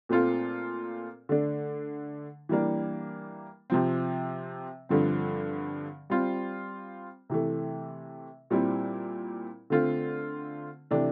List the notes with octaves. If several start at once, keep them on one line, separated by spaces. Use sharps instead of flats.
A#2 A3 C4 F4 A4
D3 A3 D4
E3 G3 A#3 D4
C3 F3 C4
G2 D3 F3 C4
G3 C4 F4
C3 E3 A3
A#2 G3 C4 E4
D3 A3 C4 F4
C3 E3 A3 D4